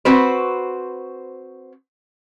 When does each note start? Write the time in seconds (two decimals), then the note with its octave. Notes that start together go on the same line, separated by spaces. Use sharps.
0.05 C4 F#4 B4 C5